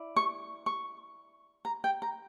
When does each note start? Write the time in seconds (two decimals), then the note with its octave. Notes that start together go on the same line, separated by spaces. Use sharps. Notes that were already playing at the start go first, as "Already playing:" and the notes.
Already playing: E4 D5
0.16 C#6
0.66 C#6
1.65 A#5
1.84 G5
2.02 A#5